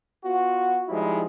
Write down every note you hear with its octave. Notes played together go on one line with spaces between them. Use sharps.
B3 F4 F#4
F3 G3 G#3 D#4 E4